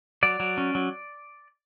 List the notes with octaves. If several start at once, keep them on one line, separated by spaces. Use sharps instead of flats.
F#3 D5
F#3
C#4
F#3